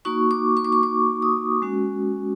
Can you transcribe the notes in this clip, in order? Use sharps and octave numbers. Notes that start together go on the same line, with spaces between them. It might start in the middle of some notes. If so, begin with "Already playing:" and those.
A#3 D#4 F#4 C#6
D6
C#6
D6
C#6
D6
D#6
G#3 C#4 F#4